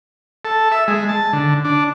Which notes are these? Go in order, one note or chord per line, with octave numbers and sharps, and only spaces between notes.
A4
E5
G#3
A5
D3
D4